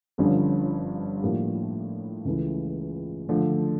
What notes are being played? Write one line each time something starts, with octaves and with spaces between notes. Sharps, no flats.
G1 G2 D3 F3 C#4
A2 F3 A#3 D4 G4
C#2 C#3 E3 A3 E4
D3 F3 A3